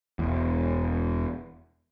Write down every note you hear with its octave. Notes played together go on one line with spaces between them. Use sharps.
E1 E2